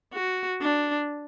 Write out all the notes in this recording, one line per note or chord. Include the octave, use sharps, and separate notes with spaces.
F#4
D4